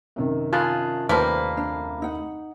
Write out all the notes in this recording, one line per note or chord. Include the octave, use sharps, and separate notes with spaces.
F#2 C3 D#3
C#3 F4 G#4 A5 F#6
D#2 F3 G3 A3 A#3 B4 C5 B5
D4
D#4 F#5